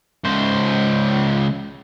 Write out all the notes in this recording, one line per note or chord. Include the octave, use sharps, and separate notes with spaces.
C#2 C5